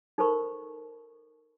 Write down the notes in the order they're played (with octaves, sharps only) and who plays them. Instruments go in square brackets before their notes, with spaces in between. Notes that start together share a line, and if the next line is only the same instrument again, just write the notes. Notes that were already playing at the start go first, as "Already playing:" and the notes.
[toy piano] D#4 A4 A#4 C5 B5 C#6